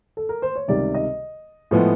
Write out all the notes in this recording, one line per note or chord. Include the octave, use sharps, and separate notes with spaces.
A4
A#4
C5
C#5
C#2 C3 D#3 G3 D5
D#5
A2 F3 G#3 B3